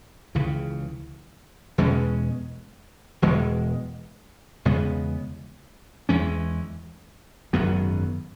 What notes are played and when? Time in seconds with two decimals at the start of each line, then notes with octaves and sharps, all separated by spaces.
0.35 C#2 C#3 E3
1.78 E2 B2 G#3 C#4
3.22 E1 E2 B2 G#3
4.65 E2 C#3 G#3 B3
6.09 E2 E3 G#3 C#4
7.53 G#1 F#2 F#3 B3